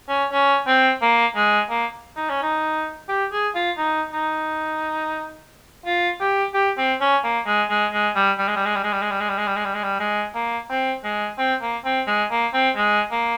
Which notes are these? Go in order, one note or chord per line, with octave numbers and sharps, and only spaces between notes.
C#4
C#4
C4
A#3
G#3
A#3
D#4
C#4
D#4
G4
G#4
F4
D#4
D#4
F4
G4
G4
C4
C#4
A#3
G#3
G#3
G#3
G3
G3
G#3
G3
G#3
G3
G#3
G3
G#3
G3
G#3
G3
G#3
G3
G#3
G3
G#3
G3
G#3
A#3
C4
G#3
C4
A#3
C4
G#3
A#3
C4
G#3
A#3